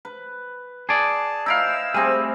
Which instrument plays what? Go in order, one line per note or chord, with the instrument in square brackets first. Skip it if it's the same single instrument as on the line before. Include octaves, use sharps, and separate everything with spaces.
[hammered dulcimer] B4
[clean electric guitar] G#4 D5 [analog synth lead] A5
[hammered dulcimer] D#4 E4 F5 [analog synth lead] E6
[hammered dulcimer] G3 A3 C4 [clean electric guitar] G#4